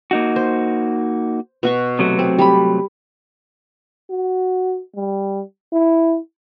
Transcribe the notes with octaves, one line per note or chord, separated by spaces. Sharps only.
A#3 D#4 F#4
C5
B2 F#4 C#6
C3 F#3 A3
C4
G3 B5
F#4
G3
E4